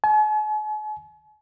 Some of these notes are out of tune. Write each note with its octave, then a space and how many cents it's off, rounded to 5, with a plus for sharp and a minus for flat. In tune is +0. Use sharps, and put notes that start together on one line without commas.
G#5 +45